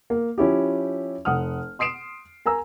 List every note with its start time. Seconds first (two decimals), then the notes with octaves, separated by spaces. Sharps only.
0.10 A#3
0.38 F3 C#4 E4 G4
1.25 F1 F#5 D#6 F6
1.79 C6 D#6 C7 D7 E7
2.46 A#4 G#5 A#5 E6